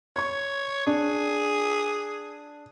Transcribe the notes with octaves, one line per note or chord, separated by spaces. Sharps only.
C#5 C#6 G#6
D4 G#4